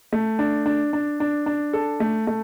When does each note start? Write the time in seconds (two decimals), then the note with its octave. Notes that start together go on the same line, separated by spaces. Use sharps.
0.13 A3
0.39 D4
0.66 D4
0.93 D4
1.20 D4
1.46 D4
1.73 A4
2.00 A3
2.27 A3